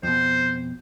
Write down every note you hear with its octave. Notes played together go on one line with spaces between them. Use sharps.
F2 B2 C5